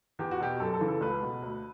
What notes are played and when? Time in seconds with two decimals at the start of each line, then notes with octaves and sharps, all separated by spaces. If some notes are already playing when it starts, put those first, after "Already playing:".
0.19 E2 G4
0.31 F#4
0.40 B2 G4
0.60 F#2 A4
0.74 A4
0.81 C#3 E3
0.88 A4
1.01 C#2 B4
1.22 B2
1.42 D2